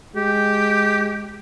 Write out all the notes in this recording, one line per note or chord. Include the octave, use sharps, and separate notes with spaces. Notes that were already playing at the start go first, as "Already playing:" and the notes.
G#3 G4